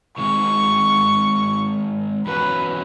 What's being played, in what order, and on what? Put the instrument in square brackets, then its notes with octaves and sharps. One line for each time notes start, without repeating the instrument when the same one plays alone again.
[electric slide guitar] D#3 G#3 C4 [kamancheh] C#6
[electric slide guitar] E2 F#3 C#4 [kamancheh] B4